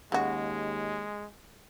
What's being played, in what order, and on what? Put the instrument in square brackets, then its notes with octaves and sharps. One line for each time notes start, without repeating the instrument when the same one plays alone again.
[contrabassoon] D#2 [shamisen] C#3 F#4 [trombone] G#3